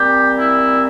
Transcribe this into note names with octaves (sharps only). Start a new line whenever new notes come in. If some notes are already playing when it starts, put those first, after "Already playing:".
Already playing: A#2 G3 C4 G4
E4